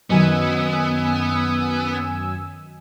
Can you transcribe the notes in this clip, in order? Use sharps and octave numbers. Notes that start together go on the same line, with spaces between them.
F#2 D#3 F#3 B3 D#5 G#5 E6